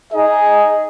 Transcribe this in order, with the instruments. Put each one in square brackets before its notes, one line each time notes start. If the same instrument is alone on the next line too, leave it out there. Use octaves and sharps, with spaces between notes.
[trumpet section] D#4 G#4 D#5